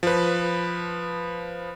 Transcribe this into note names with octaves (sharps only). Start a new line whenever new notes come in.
F3 B4